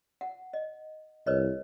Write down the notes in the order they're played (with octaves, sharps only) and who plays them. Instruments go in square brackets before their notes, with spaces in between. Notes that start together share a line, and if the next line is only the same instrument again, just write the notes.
[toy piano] F#5
D#5
[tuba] C2 [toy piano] B4 C#5 D#5